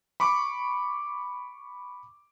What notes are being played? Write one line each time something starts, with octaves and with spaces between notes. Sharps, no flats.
B5 C#6 D6